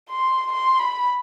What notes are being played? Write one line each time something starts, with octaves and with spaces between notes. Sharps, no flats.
C6
C6
B5